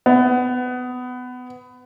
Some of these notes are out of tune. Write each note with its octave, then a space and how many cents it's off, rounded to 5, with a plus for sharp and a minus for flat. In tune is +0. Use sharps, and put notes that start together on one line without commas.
B3 +20